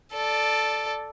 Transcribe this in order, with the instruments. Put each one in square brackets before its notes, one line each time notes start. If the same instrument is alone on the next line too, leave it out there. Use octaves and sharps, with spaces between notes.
[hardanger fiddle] A4 D5